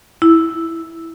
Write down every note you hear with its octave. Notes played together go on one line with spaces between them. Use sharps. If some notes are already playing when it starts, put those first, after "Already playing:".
E4